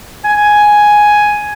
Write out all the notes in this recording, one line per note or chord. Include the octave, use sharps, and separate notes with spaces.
G#5